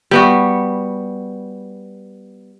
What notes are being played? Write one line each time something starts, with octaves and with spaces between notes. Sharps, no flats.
G3 B3 F#4